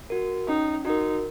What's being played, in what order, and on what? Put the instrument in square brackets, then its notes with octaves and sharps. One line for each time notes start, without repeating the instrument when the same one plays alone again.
[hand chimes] F#4 A#4
[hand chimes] C#4 [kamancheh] D#4
[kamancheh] D#4 [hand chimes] F#4 A#4